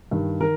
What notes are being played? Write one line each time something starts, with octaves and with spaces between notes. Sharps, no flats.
G2 D#3
D#3 A#4